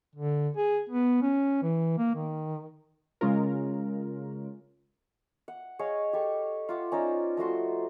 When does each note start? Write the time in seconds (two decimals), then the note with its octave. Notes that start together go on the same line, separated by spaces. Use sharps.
0.16 D3
0.57 G#4
0.89 B3
1.22 C#4
1.63 E3
1.98 A#3
2.15 D#3
3.21 C#3 G#3 C#4 F4 A#4
5.48 F#5
5.79 G#4 C#5 D#5 F5
6.13 G4 A4 C#6
6.69 F4 E5 F#5 D6
6.92 C#4 D#4 C5 D5
7.37 F3 A3 F#4 C6